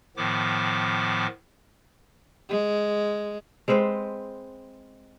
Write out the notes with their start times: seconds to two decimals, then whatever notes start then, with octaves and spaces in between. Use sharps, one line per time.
0.17 A2 D#3 F3 B3 D6
2.50 G#3
3.68 G#3 C4 B4 C5